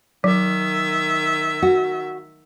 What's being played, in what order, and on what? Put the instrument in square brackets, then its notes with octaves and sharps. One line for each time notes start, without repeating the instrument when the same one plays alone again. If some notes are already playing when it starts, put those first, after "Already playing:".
[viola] D#3 E5 [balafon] F#3
[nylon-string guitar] F#4